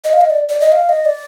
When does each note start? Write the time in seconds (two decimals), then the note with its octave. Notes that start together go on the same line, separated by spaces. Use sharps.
0.04 D#5
0.13 F5
0.21 D#5
0.30 D5
0.49 D5
0.60 D#5
0.72 F5
0.89 D#5
1.05 D5